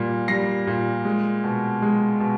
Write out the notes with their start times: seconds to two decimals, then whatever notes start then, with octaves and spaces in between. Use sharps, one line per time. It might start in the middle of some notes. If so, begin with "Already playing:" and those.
Already playing: A#2 G3
0.28 G3 A#6 C7
0.67 A#2
1.05 G#3
1.44 B2
1.82 G#3
2.20 B2